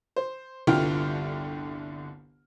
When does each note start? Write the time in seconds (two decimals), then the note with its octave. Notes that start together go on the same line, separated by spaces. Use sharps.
0.16 C5
0.67 G1 C2 D3 F4 G5 F6